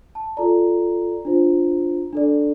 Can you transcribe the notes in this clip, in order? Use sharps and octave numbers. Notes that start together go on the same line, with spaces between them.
A5
F4 A4 D5 A#5
D4 F4 C5
D4 A4 D5